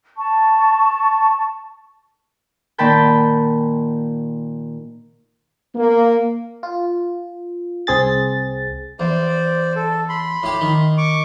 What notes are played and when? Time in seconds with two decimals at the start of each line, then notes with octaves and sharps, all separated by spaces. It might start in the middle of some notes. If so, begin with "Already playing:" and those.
0.17 A5 C#6
2.78 A#2 D#3 G5 A5 B5 G6
5.76 A#3
6.63 F4
7.87 C2 C4 G#4 A6
9.00 E2 C5 D5
9.75 A4
10.09 B5 C6
10.43 A2 G4
10.61 D#3
10.98 C#6 D6